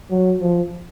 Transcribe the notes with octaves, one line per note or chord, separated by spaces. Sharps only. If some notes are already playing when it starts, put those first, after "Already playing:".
F#3
F3